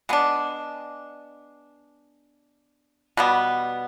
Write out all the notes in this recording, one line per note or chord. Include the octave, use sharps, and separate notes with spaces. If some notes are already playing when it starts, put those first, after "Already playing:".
G#3 B3 D4
B2 G3 B3